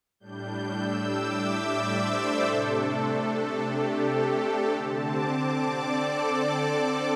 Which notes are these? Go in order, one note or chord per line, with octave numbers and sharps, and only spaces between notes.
A2 G3 D4 G6
E6
D6
E5
D5
C5
A4
C3 A3 D4
G4
A4
D3 C4 A5
D6
D6
D5
A4